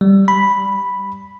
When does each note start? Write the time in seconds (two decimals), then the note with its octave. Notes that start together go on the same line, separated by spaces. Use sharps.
0.01 G3
0.28 B5